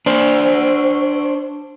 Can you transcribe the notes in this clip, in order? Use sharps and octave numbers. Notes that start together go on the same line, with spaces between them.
D4 C5